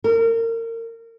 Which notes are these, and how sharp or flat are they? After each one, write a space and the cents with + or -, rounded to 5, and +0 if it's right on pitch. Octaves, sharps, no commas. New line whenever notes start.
A#4 -30